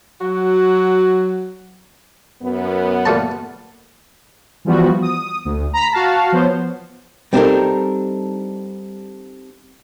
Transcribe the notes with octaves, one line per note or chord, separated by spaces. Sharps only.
F#3 F#4
F#2 B3
A#2 A3 A5
E3 F3 G3 B3 F#4
D#6
D2
A#5 B5 B6
F#4 F5 A5
F3 B3 C5 C#5
G3 C4 D4 D#4 A4 A#4